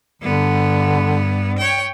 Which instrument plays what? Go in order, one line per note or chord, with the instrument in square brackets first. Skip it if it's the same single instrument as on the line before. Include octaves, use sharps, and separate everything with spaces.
[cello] G2 B3 [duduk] D3
[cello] C#5 G5